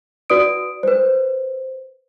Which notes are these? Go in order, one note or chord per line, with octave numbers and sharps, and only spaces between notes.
F#4 B4 D5 D#6 D7
B4 C5